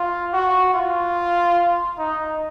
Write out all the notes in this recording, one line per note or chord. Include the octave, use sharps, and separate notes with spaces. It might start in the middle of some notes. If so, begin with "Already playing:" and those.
Already playing: F4
F#4
F4
D#4